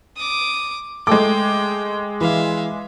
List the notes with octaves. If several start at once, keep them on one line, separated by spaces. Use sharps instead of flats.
D6 D#6
G#3 A3 G#4 G5 D6
E3 E5 F5